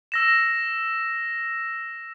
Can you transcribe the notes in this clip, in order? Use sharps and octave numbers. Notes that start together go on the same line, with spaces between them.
E6 A#6 E7